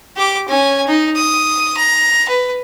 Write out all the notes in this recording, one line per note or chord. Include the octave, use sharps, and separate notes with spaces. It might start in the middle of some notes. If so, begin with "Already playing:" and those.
G4 D6
C#4 G#5
D#4
D#6
A#5
B4